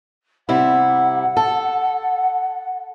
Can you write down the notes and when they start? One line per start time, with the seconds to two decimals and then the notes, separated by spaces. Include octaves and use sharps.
0.49 C3 G3 E4 F#5
1.37 A4